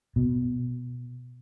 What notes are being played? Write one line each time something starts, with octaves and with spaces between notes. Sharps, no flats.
B2